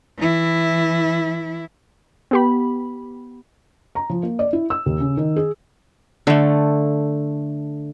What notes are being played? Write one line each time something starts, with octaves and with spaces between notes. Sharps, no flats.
E3 E4
B3 G4 B5
A#5
F3
A#3
D5
E4
E6
D#2
C#3
D#3
G#4
D3 A3